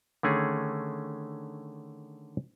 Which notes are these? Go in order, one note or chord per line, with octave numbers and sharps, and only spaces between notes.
D3 D#3 A3 C#4 G#4